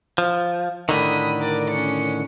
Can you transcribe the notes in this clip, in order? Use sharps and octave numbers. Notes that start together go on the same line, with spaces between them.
F3
A2 D3 D#3 B5 D#6
A#4 D5
C#4 C#7